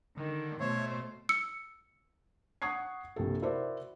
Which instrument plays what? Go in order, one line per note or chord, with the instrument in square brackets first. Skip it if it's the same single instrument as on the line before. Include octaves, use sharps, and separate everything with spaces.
[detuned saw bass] D3 [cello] D#3
[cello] B2 C5 [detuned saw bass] A3 [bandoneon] C#5
[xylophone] E6 C#7
[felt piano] F#5 C#6 D#6 G#6 C7
A#1 C3 A4
E4 F#4 A#4 C5 D5 E5